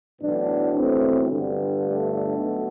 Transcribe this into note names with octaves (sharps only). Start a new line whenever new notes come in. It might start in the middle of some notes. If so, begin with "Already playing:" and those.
B1 A2 E3 B3 D4
A3 C4
G1 G2 D3
A3
B1 B2